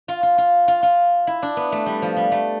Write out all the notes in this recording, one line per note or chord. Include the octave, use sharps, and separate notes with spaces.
F4
F4
F4
F4
F4
E4
D4
B3
A3
G3
F3
G3
A3